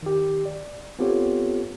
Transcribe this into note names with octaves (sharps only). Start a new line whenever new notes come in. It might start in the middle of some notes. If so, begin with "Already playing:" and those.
D#3 G4
D5
B3 C4 F4 G4 A4 C#5